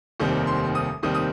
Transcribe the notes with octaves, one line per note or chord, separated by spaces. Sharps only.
F1 D#2 D#3 G3 C4
C6
D#6
F1 D#2 D#3 G3 C4 D#6
D#6